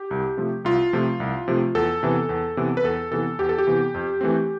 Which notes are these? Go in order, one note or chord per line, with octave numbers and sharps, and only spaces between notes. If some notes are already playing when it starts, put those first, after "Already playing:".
Already playing: G4
C2
C3 F3 A3
C2 F4
C3 F3 A3
C2
C3 F3 A3
E2 A4
C3 E3 B3
E2
C3 E3 B3
B4
E2 A4
C3 E3 B3 A4
E2 G4
A4
G4
C3 E3 B3
F2
E3 A3 C4